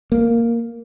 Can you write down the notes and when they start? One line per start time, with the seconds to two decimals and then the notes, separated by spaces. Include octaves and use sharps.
0.12 A#3